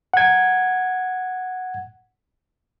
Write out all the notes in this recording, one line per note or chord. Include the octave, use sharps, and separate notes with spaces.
F#5 G#6